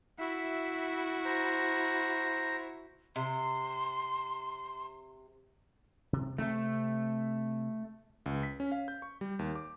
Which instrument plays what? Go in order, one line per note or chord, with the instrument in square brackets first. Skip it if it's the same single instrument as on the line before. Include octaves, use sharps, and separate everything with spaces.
[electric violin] E4 F#4 [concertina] E5
[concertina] C5 A#5
[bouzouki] C3 [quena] C6
[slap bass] C3
[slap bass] C3 C4 [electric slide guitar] A3
[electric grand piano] C#2
B6
C#4
F5
G6
C#6
G3
D#2
D6